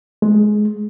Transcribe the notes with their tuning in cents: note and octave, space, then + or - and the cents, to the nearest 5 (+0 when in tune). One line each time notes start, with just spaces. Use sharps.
G#3 +20